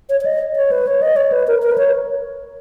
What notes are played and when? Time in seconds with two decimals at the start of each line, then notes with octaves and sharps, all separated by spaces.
0.09 C#5
0.21 C#5
0.26 D#5
0.56 C#5
0.71 B4
0.87 C#5
1.02 D#5
1.16 C#5
1.32 B4
1.48 A#4
1.62 A#4
1.71 B4
1.78 C#5